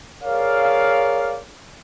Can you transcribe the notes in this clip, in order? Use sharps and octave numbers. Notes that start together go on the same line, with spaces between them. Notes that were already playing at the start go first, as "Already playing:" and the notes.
G#4 A#4 C#5 D5 F5